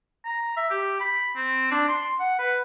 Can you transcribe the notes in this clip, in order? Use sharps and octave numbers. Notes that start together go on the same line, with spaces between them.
A#5
E5
G4
B5
C4
D4
C6
F#5
B4